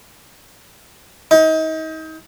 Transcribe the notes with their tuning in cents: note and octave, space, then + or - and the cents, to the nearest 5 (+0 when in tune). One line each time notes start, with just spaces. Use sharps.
D#4 +35